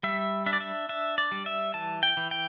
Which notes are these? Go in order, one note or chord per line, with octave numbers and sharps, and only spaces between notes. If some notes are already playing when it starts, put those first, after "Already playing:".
G3 E5
D4 E5
D5
E5
D4 E5
D5
G3
E5
E3 A5
G5
E3
G5